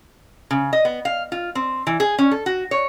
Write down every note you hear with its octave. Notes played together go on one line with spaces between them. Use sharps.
C#3
D#5
B3
F5
F4
C4
E3
G#4
C#4
A4
F#4
C#5